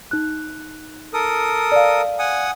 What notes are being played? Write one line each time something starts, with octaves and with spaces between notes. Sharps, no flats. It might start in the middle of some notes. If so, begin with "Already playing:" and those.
D#4 F#6
A4 A#4 D#6
D5 F5
F#5 G#5 D#6